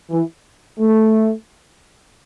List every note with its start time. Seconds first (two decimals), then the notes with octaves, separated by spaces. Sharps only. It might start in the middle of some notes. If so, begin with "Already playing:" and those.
0.10 E3
0.79 A3